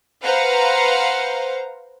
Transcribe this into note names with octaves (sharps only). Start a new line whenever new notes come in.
B4 C5 F5 F#5 A#5